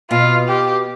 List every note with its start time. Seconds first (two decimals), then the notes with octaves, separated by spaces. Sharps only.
0.11 B2 F4
0.48 G4